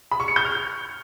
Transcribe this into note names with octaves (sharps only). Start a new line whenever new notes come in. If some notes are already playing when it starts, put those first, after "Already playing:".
B5
C#6
C#7
G6
F6